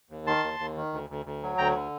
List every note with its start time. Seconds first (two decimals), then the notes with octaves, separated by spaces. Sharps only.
0.10 D#2
0.26 D#3 A5 C6
0.44 D#2
0.60 D#2
0.77 D#3
0.93 D2
1.10 D2
1.26 D2
1.43 F#3
1.58 D2 G5 A#5
1.75 D3